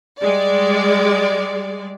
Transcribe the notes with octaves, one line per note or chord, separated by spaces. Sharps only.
G3 G#3 D5